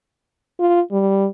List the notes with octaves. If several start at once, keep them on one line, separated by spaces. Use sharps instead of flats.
F4
G3